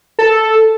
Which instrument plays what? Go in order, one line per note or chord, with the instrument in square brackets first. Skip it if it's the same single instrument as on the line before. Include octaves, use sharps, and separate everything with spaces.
[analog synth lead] A4